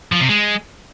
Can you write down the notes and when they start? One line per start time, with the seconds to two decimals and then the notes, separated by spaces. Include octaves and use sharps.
0.12 F3
0.20 C3
0.29 G#3